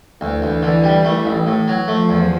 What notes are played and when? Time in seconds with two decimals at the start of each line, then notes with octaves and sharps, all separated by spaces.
0.21 D2 E3
0.42 D2
0.63 D3
0.84 G3
1.05 A3
1.25 A1
1.47 A2
1.68 F#3
1.88 F3 A3
2.09 E2